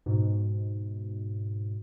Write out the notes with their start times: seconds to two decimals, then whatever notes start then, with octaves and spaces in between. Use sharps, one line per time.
0.06 G#2 B2